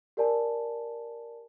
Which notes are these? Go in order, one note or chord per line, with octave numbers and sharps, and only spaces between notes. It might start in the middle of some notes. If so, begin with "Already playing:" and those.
G4 A#4 D5 G#5 A5